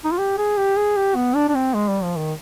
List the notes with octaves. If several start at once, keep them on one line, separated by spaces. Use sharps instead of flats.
D#4
F4
G4
G#4
G4
G#4
G4
B3
D4
D4
C4
G#3
G3
F3
D#3